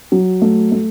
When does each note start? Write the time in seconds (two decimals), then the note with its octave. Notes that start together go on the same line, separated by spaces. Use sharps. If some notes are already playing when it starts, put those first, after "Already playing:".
0.12 F#3
0.42 A3
0.72 A3